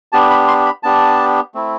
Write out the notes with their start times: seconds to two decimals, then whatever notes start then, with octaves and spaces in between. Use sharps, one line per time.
0.12 B3 D4 G4 A5
0.30 B5
0.48 C6
0.66 B5
0.83 B3 D4 G4 A5
1.55 A3 C4 E4